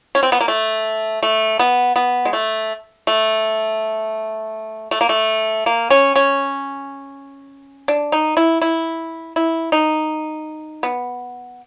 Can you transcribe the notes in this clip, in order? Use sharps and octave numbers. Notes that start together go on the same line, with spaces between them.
C#4
C4
B3
A#3
A3
A3
B3
B3
G#3
A3
A3
A3
A#3
A3
A#3
C#4
C#4
D4
D#4
E4
E4
E4
D#4
B3